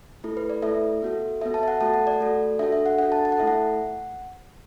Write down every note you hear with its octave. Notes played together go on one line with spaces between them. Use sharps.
A3 E4 A4
B4
D5
A3 E4 A4 E5
B3 F#4 A4
B3 F#4 A4 E5
A5
E5
F#5
A3 F#4 A4 A5
F#5
D5
A3 F#4 A4
D4 F#4 A4 E5
E5
F#5
D4 F#4 A4 F#5
A5
A5
F#5
A3 E4 A4 E5
F#5